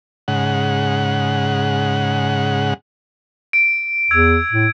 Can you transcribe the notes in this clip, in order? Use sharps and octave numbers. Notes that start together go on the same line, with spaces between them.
G#2 C#3 F#5
D7
E2 E6 G#6
A2